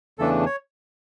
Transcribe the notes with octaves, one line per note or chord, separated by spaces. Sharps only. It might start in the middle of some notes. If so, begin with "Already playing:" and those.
E2 C#3 E3 A3 D4 A4
C#5